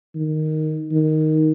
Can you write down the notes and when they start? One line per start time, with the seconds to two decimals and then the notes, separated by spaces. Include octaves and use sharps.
0.15 D#3
0.92 D#3